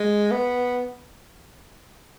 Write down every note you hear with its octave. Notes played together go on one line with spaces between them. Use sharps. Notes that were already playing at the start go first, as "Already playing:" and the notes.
Already playing: G#3
B3